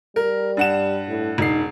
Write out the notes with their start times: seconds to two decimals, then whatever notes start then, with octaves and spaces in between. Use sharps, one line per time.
0.16 G3 A#4
0.57 G2 F#5 E7
1.08 A2
1.38 E1 D#4 C7